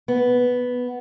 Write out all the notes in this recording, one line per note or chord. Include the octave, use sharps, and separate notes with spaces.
B3